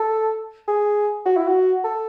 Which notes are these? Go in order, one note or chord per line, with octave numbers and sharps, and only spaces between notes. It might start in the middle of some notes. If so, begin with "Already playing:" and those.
Already playing: A4
G#4
F#4
E4
F#4
A4